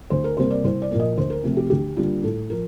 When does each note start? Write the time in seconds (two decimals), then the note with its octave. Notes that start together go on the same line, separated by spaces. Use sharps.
0.10 D2 C5
0.24 A#4
0.37 C3 G3 A#3 C5
0.50 D5
0.64 C2 C5
0.82 D5
0.91 A#2 F3 A#3
1.00 D#5
1.17 D2 C5
1.30 A#4
1.44 C3 F3 A3
1.57 G4
1.70 D2 G4
1.97 D3 G3 A#3 F4
2.23 A2 A4
2.50 F3 A#4